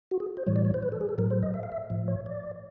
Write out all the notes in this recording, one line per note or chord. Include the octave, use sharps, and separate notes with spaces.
F#4
G#4
C5
A2 E3 G3 C#5
D5
C#5
C5
B4
A4
G#4
A4
A2 F#3 A#4
C5
D#5
E5
F5
E5
A2 F3
C#5
D5